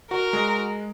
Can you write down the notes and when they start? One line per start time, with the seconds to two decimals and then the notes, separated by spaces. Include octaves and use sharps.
0.11 F#4 A#4
0.33 G#3